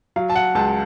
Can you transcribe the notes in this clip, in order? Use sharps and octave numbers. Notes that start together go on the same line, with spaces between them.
F#3 F5
A5
F#5
C#2 A5